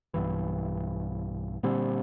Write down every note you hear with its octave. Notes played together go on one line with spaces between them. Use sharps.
B1 G2 E3
A#2 D3 G3 C4